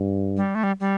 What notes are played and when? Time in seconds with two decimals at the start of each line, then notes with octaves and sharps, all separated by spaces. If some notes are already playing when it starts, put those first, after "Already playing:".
Already playing: G2
0.37 G3
0.55 A3
0.63 G3
0.80 G3